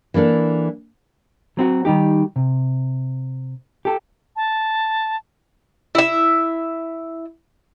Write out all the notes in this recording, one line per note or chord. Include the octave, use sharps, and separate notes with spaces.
E3 A#3 D4 A4
F#3 C4 F#4
D#3 G3 D#4 G4
C3
G4 A4
A5
E4 E5